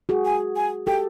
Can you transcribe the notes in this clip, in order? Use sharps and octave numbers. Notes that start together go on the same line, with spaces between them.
F#4 G#4
G#5
G#5
G4 A4 G5